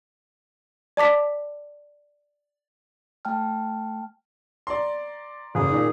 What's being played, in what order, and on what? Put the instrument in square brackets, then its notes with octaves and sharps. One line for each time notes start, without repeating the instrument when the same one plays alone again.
[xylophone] D5 A5 D6 B6
[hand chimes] A3 G5 A5 F6
[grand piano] D5 A#5 C6
[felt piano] F#1 [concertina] G#4
[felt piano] A#2 D#3